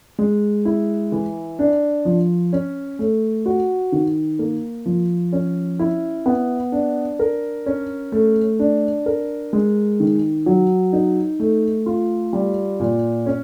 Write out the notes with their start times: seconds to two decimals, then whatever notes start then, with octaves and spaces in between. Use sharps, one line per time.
0.19 G#3
0.65 E4
1.12 E3
1.59 D4
2.05 F3
2.53 C#4
2.99 A3
3.46 F#4
3.92 D#3
4.39 A#3
4.86 F3
5.33 C#4
5.79 E4
6.26 B3
6.72 D4
7.19 A#4
7.66 C#4
8.12 A3
8.59 D4
9.06 A#4
9.53 G#3
10.00 D#3
10.46 F#3
10.93 D#4
11.40 A3
11.86 F4
12.33 G3
12.80 A#2
13.26 C#4